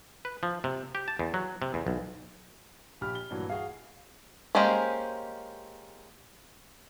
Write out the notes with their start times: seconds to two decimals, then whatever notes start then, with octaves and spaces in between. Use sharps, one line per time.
0.25 B4
0.43 F3
0.64 C3
0.95 G4
1.08 A5
1.19 E2
1.34 F#3
1.62 C3
1.74 E2
1.87 B1
3.01 A#1 G4 B5 F6
3.15 G7
3.30 G2 A#2 E3 F#3
3.50 F#4 G#4 F5
4.55 G#3 A#3 C#4 G4 C5